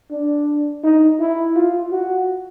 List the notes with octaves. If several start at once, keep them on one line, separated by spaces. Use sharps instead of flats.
D4
D#4
E4
F4
F#4